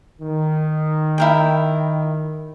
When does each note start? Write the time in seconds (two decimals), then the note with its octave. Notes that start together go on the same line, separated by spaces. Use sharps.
0.21 D#3
1.18 E4 A#4 G5